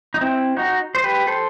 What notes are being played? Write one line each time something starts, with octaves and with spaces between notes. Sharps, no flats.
D#4
C4 E4
D#4 F#4
C5
G4 B4
A4 C5